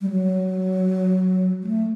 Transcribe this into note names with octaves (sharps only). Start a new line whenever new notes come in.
G3
F#3
G3
A3